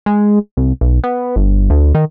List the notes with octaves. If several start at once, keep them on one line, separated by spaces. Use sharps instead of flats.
G#3
C2
B1
B3
G1
D2
D#3